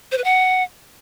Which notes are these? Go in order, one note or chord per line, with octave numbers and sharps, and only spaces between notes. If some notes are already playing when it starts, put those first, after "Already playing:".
C5
B4
F#5